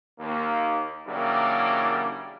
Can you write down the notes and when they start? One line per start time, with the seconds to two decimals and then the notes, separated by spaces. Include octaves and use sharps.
0.19 D#2 A#3
1.07 C#3 E3 F#3 G3 A#3 D4